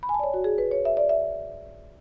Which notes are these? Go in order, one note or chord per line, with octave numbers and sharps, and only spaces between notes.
B5
G#5
A5
D5
C#5
F#4
G#4
B4
C#5
E5
D5
E5